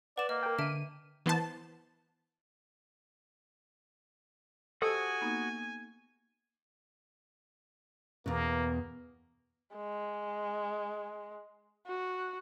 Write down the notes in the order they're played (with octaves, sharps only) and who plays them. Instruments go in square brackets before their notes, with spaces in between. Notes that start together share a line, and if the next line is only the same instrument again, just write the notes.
[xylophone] B4 E7 [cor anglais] D5 [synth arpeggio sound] F#5
[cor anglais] A#3 [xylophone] D#5
[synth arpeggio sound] A#4 G5
[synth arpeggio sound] D3 D#7 [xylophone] E5 A5 D7
[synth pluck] E3 B3 C5 A5
[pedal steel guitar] F#4 D#6 [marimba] G4 C5 D#5 [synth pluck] A4 [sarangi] G#5
[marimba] A#3 B3 D#4
[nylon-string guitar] E2 B2 [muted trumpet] A#3
[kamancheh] G#3
F#4